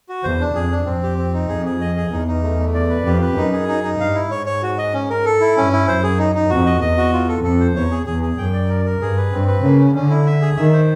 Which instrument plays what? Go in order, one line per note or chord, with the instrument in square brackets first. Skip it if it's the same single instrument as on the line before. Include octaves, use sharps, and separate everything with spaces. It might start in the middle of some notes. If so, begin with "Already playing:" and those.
[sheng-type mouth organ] F#4
[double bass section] E2 [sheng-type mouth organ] C5
[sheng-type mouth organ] D4
[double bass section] F2 [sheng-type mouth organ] G#4
[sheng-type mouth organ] D4
[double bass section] F2 [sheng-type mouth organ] C4
[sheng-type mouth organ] G4
C4
D#4
[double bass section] F2 [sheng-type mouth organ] G#4
[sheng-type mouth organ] G#4
D#5
G#4
[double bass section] E2 [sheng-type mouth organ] D#4
[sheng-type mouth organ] D#4
A3
A3
D5
B4
[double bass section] F2 [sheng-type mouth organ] G4
[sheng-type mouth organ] B4
[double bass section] F#2 [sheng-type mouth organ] D#4
[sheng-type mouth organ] G#4
D#4
D#4
[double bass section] G2 [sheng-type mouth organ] F5
[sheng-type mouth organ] E4
[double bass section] G#2 [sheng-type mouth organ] C#5
[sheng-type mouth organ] C#5
F#4
D#5
C#4
A#4
A4
E4
[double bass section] G2 [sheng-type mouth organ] C#4
[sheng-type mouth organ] E4
[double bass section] F#2 [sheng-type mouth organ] C5
[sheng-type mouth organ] G#4
D#4
D#4
[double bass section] F2 [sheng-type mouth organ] F#4
[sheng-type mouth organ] D#5
[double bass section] E2 [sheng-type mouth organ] D#5
[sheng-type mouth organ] F#4
F4
A4
[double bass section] F2 [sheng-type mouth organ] A4
[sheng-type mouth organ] C5
[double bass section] E2 [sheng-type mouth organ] C#5
[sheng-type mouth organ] G#4
[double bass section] E2 [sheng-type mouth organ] G#4
[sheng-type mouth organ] G#4
[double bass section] F#2 [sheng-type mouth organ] G5
[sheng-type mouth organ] D5
A#4
A#4
[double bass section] G2 [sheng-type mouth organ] G#4
[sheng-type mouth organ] B4
[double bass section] G2 [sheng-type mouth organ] C4
[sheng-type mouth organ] B4
[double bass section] C#3 [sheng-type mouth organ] A#3
[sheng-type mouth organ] C#4
[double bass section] D3 [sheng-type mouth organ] C#4
[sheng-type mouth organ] E4
E5
G#4
[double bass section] D#3 [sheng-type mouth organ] E5
[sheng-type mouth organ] C5